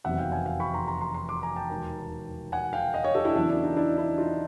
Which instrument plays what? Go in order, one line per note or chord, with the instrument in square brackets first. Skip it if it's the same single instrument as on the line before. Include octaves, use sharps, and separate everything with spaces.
[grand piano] F1 E2 C3 D#3 F#3 E5 F#5
F5 G5
F#5 G#5
F5 G5
B5 C#6
A#5 C6
A#5 C6
A#5 C6
A#5 C6
C6 D6
G#5 A#5
G5 A5
E1 D#2 D#3
F#5 G#5
F5 G5
D#5 F5
C#5 D#5
G4 A4
D4 E4
E2 C#3 F#3 D4 E4
D4
D#4
D4 E4
D4 E4
D#4 F4